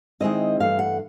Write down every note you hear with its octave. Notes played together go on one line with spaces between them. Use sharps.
D#3 G#3 C4 E4 D#5
G2 E3 A3 F5
F#5